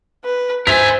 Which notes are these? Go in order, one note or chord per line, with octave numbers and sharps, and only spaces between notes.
B4
A#4 C5 E5 G#5 B6